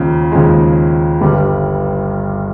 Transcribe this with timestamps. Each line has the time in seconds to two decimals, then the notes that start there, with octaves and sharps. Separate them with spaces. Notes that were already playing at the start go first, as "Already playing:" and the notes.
Already playing: D#2 C#3 F3 G#3
0.32 D#2 C#3 F3 G#3
1.21 G1 G2 G3